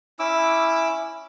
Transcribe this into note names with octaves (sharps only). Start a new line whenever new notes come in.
C#4 E4 D6 E6